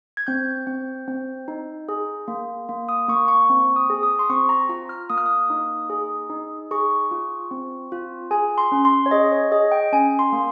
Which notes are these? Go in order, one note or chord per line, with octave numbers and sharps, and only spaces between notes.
G#6
C4 G6
C4
C4
D#4
G#4
A#3
A#3
D#6
A#3 C#6
C#6
C4 C#6
D#6
G#4
D#6
C6
C4 C#6
A#5
F4 A#5
F6
A#3 D#6
F6
D#6
D#4
G#4
D#4
G#4 C#6
F4
C4
F4
G#4 G#5
C6
C#4
C6
C#5
G#4 D#5
C#5
G#4 D#5
G5
C#4 G#5
C6
A#3